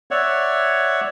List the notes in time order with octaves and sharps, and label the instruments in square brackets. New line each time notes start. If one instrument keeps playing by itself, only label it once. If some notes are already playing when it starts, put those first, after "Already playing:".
[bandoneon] C#5 D5 E5 F#5